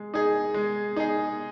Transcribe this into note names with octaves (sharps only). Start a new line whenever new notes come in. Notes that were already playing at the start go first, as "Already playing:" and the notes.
Already playing: G#3
D#4 G#4
G#3
D#4 G#4